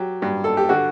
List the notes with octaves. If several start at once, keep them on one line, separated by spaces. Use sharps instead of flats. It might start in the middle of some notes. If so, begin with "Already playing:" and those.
Already playing: F#3 G4
G2
A4
G4
D3 F#4